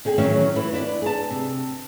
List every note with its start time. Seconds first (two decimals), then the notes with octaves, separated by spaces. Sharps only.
0.05 D3 G#4 G5
0.18 A2 D#3 E3 F#3 C#4 E5
0.55 E3 E4 B4
0.73 D4 E4 B4 D5
1.02 G#4 A5
1.31 C3